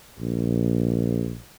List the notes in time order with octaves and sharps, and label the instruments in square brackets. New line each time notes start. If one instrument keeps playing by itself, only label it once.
[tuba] A#1